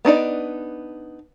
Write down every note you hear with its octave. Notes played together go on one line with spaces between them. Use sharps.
B3 D4 D#4 D5